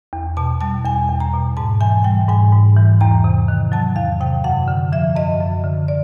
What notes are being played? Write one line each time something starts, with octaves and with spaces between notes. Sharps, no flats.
E2
B2 A5
G3 A5
E2 G#5
E2
A#5
B2
G#2 A5
E3 G#5
G3 G5
G#2 G#5
G#2
E3
E2 A#5
C3
D#3
F#3 A5
E2 F5
C3 G5
F#2 F#5
D3
F3 E5
F#2 D#5
F#2
D3
D5